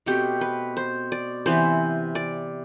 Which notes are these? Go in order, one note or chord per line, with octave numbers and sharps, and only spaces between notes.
B2 A3 C4 G4
B4
C5
D5
C3 E3 B3 C5
D5